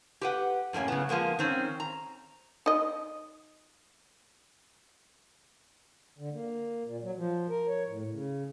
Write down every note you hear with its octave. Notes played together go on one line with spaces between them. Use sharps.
G4 B4 F#5
F#2 A2 A#3 C#4
C#3 B3
F3 G#3 A#3 B3
D#3 C4 C#4
A#5
D#4 D#5
D3
A#3
A#2
F#3
F3
A#4
C#5
A2
C#3